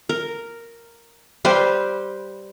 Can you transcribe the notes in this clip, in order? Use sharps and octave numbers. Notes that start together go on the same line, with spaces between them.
A#4
G3 G4 B4 C5